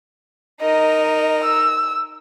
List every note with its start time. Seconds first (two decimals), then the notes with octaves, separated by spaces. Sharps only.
0.61 D#4 A#4 D#5
1.44 E6